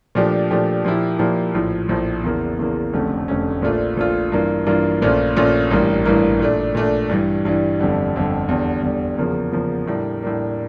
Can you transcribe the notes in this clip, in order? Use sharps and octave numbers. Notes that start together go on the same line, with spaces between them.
A#2 F3 A3 D4 G4
A#2 F3 A3 D4 G4
A#2 F3 A#3 E4 G4
A#2 F3 A#3 E4 G4
A#1 A2 F3
A#1 A2 F3
E2 C#3 E3 A#3
E2 C#3 E3 A#3
F1 F2 D3 A3 C#4
F1 F2 D3 A3 C#4
A#1 A#2 A3 D4 F4
A#1 A#2 A3 D4 F4
G2 E3 A#3 D4 F4
G2 E3 A#3 D4 F4
A#1 A#2 A3 C#4 F4
A#1 A#2 A3 C#4 F4
A1 G2 E3 G3 A#3
A1 G2 E3 G3 A#3
A#2 A3 D4
A#2 A3 D4
G2 E3 G3
G2 E3 G3
G1 F2 D3 G3
G1 F2 D3 G3
E2 D3 G3
E2 D3 G3
E2 C#3 F3 A#3
E2 C#3 F3 A#3
A2 G3 A#3 D4
A2 G3 A#3 D4